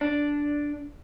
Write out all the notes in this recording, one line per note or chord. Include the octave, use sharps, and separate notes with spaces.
D4